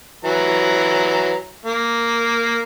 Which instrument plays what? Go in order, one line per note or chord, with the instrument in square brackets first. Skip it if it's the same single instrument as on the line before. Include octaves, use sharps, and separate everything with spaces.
[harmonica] E3 F#3 A#5
A#3